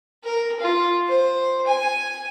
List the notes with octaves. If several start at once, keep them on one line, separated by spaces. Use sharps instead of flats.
A#4
F4
C5
G#5